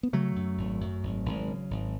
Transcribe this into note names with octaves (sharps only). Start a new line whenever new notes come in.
B3
C#3 F#3 A3
F#2
G#1
F#2
G#1
G#1
C#3
G#1